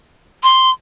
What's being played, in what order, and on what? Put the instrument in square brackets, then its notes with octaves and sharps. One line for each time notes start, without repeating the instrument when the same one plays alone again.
[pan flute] C6